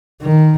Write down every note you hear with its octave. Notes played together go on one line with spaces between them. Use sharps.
D#3